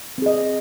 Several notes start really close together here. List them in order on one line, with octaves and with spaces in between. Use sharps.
C4 G#4 D#5